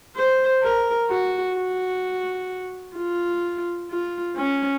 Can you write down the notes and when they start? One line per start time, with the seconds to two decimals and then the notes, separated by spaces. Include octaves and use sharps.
0.16 C5
0.62 A#4
1.10 F#4
1.56 F#4
2.96 F4
3.90 F4
4.36 C#4